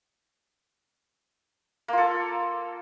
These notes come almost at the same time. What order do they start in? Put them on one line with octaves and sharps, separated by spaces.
A#3 F4 A4